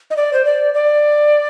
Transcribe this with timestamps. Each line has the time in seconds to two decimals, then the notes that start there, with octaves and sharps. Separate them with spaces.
0.11 D#5
0.16 D5
0.33 C5
0.45 D5
0.74 D5